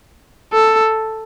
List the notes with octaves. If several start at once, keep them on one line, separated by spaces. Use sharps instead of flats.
A4